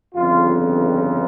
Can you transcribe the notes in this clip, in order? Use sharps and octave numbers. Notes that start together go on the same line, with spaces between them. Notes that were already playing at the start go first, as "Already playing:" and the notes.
G1 F2 C#3 F4